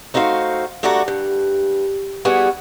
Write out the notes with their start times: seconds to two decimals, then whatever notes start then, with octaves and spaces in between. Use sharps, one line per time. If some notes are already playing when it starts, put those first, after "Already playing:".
0.14 A3 D#4 F#4 C5 F5
0.83 G2 A3 F#4 A4 D5 A#5
1.08 G2
2.25 G3 B3 E4 F#4 G#4